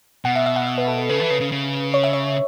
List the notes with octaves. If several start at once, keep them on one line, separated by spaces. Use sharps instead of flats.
B2 F#5
E5
E5
F#5
E5
B4
A4
A4
C#3 B4
E3
C#3
C#3
C#3
C#5
E5
C#5